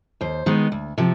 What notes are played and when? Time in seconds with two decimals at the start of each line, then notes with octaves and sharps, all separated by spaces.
0.21 D#2 C5
0.46 D#3 G#3 B3
0.72 D2
0.98 C3 F3